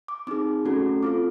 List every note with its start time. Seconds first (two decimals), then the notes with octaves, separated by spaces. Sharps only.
0.08 D6
0.27 C4 D#4 G#4 D6
0.65 A3 C#4 F#4 A4
1.02 C4 F4 A4 D6